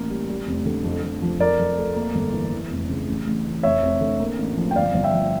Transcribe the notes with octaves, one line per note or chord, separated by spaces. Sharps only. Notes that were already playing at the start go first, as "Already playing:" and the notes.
Already playing: A1 A#3 A#4
G3
G3
F1
D3
F2
F2
F3
F2 A#4 D5
F2
A3
A#3
G1
E3
E3
F1
C#3
A1
A1
E3
F1 C#5 E5
F1
D3
A#3
A1
F3
G5
G1 D5 F5
G1
E5 G5
F3